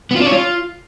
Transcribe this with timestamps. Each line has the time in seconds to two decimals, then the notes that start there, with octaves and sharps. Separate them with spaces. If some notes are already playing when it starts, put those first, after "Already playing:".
0.11 B3
0.16 F4
0.21 D4
0.26 C#5
0.32 F4